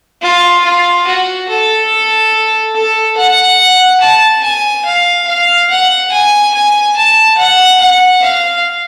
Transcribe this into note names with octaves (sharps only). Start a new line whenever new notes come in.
F4
F4
F#4
A4
A4
F#5
A5
G#5
F5
F5
F#5
G#5
G#5
A5
F#5
F#5
F5